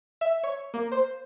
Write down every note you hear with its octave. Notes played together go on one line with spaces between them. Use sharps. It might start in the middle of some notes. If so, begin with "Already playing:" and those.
E5
C#5
A#3
C5